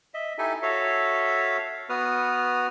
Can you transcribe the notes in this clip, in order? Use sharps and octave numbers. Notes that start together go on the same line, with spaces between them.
D#5 E5
D#4 E4 G4 A4 G#5
F#4 A4 C#5 E5 F5
B3 F#4 B4 D#6 F6